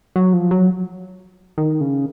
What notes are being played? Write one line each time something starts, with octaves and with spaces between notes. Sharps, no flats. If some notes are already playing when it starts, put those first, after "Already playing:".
F#3
F3
F#3
D#3
C#3